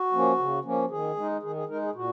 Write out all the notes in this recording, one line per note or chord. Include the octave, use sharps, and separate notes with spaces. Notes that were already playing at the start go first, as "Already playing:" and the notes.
Already playing: F#4
F3 A#3 C#4
C#3
F3 A#3 C#4
D#3 G#4
G#3 D#4
D#3 G#4
G#4
G#3 D#4 A#4
G#4
A#2 F#4